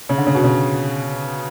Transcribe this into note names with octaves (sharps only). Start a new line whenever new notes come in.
C#3
D3
C#3
B2
C#3